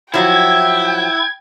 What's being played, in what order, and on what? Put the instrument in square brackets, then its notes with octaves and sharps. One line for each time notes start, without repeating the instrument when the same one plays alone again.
[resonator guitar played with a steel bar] F3 F#3 [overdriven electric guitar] E4 [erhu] G5 [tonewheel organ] G#6